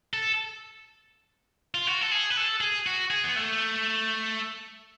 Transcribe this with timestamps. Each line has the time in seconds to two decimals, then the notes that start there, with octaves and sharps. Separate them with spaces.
0.14 A4
1.74 F4
1.87 F#4
2.01 A4
2.11 G#4
2.30 B4
2.37 A4
2.61 G#4
2.87 F#4
3.10 G#4
3.24 B3
3.36 A3